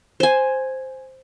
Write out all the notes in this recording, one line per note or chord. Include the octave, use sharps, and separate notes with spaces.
C5 G#5